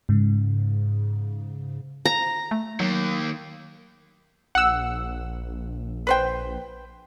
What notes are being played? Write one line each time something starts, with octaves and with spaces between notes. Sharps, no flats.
G#2 C#3
A#5
A3
D#3 F#3 A#3
A#1 F#5 E6
B4 C5 G5